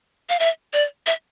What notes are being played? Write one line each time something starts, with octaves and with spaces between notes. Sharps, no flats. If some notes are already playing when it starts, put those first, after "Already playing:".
F5
E5
D5
E5